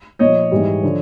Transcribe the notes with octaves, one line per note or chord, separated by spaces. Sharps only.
A#2 F3 C#5 D#5
G#2 E3 G3
D3 F3